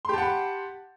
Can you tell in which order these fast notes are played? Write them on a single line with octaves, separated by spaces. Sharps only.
C6 G4 A5 F#5 B5